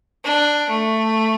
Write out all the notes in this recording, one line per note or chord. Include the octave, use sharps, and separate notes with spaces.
D4
A3